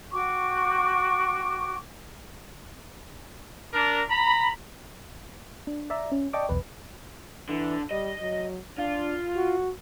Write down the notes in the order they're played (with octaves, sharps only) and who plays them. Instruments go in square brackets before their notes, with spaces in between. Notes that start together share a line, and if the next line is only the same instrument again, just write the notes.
[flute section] F#4 G5 C#6 D6
[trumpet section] D4 A#4
A#5 B5
[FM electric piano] D4
D5 E5 A#5
C#4
D5 D#5 G5 A5 C#6 D6
B1 E2 B4
[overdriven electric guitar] D3 [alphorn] E3
[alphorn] G3 [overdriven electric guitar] D#5
[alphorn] F#3
[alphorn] D4 [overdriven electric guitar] F4
[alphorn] F#4